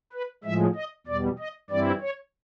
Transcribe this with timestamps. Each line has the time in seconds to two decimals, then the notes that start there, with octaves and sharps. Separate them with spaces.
0.13 B4
0.44 A2 F3 G#3 E5
0.75 D#5
1.07 E2 B2 G3 D5
1.39 D#5
1.70 G2 E3 G3 C4 E4 D5
2.01 C#5